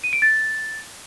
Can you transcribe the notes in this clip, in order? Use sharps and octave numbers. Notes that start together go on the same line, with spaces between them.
D#7
D7
A6